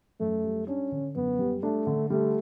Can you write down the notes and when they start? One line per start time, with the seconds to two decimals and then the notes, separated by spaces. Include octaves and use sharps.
0.20 F#2 A3
0.44 G3
0.67 C#4 D4
0.92 D3
1.15 F#2 B3
1.39 G3
1.63 A3 D4
1.87 D3
2.10 G3 A3